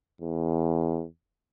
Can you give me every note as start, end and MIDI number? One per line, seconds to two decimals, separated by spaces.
0.21 1.05 40